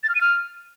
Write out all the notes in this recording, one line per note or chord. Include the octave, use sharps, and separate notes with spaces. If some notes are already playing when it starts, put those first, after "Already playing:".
A6
F6
D#7
F6